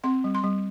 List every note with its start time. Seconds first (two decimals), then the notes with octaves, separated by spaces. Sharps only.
0.04 C4 C6
0.24 G3
0.35 C6
0.44 G3